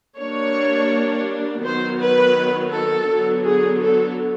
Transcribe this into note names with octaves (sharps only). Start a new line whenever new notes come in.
G3 A#3 D4 C#5
D#3 F#3 B3 C5
B4
A4
D3 F#3 B3
G#4
A4